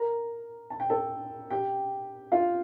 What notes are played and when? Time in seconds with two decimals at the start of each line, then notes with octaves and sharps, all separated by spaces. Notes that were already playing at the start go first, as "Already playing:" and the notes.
Already playing: A#4 A#5
0.70 A5
0.80 G5
0.90 A4 A5
1.50 G4 G5
2.32 F4 F5